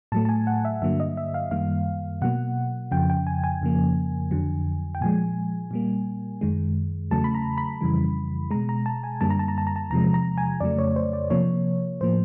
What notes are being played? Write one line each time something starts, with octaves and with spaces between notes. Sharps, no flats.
A2 F#3 A3 A5
A5
G#5
F#5
E5
G2 D3 F#3 A#3 E5
D#5
E5
F5
F#2 D#3 G3 A#3 F5
B2 F#3 A#3 F#5
F2 C#3 F3 G5
G5
G#5
G#5
F2 C#3 F3 A#3
F2 D3 F#3
G5
A#2 F3 G#3 G#5
A#2 G3 A#3
F#2 D#3 G#3
E2 C#3 F#3 A3 A5
B5
A#5
B5
F2 C#3 E3 G3
B2 G#3 A#5
A#5
A5
G#5
F#2 D3 G3 A#3 A5
A#5
A5
A#5
A5
A#5
A5
E2 C3 F3 G#3 A#5
A#5
G#5
F2 C#3 F#3 A3 D5
C#5
C5
D5
C3 F3 A#3 C#5
A2 F3 A#3 C5